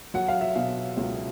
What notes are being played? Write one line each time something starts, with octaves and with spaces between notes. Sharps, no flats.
F#3 F#5
F5
E5
B2 F5
C#2